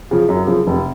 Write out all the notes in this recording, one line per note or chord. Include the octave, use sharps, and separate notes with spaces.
C#3 F3
F#2
C#3 F3
F1